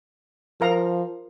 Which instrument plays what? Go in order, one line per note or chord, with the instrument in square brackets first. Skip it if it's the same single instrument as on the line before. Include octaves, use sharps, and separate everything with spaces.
[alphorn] F3 [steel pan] A#4 F5 A#5